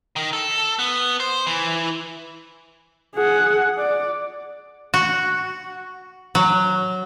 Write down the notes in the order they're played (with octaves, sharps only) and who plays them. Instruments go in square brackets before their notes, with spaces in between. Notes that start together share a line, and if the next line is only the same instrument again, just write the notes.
[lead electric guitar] D#3
A4
B3
C5
E3
[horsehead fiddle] G#4 F#5
D5
[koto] F#4
F#3